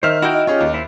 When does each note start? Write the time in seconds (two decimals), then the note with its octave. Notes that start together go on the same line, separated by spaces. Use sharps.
0.03 D#3 C5 D#5 E5 F6
0.22 D#4 E4 F#4 G5
0.34 D#5
0.47 C#4 F4 G4 G#4 C#5
0.60 D#2
0.74 E4 C5 E5